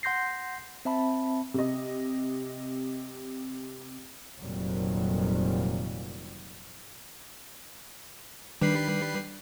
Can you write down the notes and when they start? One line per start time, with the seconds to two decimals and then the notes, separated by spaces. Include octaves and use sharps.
0.03 F#5 C6 G6 A#6 C7
0.85 C4 E5 A5 B5
1.54 C3 D#5
4.40 F1 F2 A#2 D#3 F#3 G3
8.61 D#3 G3 D4 B4 C7